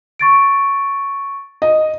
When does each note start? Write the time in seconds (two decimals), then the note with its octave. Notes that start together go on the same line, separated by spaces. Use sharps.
0.19 C#6 A6 D7
1.62 D#5